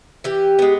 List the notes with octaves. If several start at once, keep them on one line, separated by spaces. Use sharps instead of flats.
E3 G4
G#3 B3